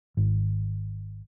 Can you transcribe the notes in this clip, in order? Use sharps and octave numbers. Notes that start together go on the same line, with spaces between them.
G#1